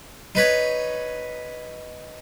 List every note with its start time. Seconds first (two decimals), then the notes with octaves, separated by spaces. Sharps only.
0.35 D#4 B4 C#5